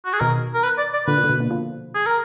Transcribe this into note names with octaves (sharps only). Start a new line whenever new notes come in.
F#4
G#4
B2 D#3 A#4
A#4
B4
D5
D5
A#2 D3 B4
A#2
D3
B2
A#2 D3
D3 F3
G#4
A#4